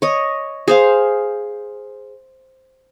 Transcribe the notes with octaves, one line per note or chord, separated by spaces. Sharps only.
C#5 D#5
G#4 C5 F5